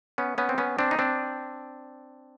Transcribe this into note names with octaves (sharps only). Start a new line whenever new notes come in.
B3 C#4
B3 C#4
C4
B3 C#4
C4 D4
D#4
C4 D4